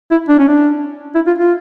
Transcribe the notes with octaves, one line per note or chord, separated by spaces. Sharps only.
E4
D4
C#4
D4
E4
F4
F4